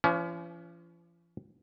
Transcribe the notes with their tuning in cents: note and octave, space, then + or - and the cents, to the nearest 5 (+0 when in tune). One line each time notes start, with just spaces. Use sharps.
F3 -45 C#4 +30